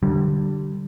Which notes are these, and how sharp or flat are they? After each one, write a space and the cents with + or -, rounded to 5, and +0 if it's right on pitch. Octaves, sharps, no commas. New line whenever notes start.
D3 +20 G3 -20